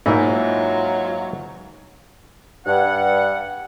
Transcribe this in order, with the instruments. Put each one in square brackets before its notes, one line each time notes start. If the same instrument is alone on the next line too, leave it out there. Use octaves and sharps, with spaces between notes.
[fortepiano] G#2 [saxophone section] F#3 F4 [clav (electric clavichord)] A#3 E4 [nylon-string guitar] D#5 E5
[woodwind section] G2 F#5